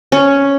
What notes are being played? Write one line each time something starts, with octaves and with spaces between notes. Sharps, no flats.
C#4